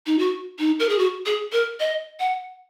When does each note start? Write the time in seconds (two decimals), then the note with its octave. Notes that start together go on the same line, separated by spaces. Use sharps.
0.06 D#4
0.18 F#4
0.59 D#4
0.79 A#4
0.89 G#4
0.98 F#4
1.26 G#4
1.52 A#4
1.80 D#5
2.20 F#5